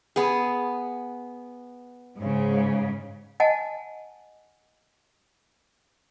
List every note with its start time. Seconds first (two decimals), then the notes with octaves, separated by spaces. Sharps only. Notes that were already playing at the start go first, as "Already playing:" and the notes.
0.16 B3 G#4
2.17 G#2 C#3
3.40 D#5 F#5 G#5 A5